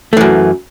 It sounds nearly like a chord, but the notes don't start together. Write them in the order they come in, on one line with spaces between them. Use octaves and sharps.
A3 E3 F#2